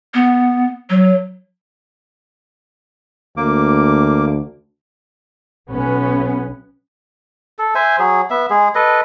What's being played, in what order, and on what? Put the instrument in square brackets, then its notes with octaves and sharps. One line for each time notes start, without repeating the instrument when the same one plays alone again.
[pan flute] B3
F#3
[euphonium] D2 [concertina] A#3 D6
[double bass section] B1 B3 C#4
[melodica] A4
C5 E5 G#5
F#3 G#4
B3 E5
G#3 G#4
A4 B4 D#5